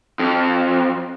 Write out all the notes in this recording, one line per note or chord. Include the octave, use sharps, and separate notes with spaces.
F2